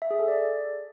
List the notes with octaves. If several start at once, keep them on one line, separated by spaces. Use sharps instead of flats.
E5
G#4
A4
D5